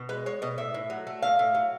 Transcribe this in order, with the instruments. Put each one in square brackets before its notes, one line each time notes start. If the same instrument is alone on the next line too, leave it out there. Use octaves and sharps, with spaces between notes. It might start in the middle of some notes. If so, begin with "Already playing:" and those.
Already playing: [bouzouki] B2
G#3 B4
G#3 C#5
B2 D#5
A2 E5
A2
F#3
A3
A2 F5
A2
F#3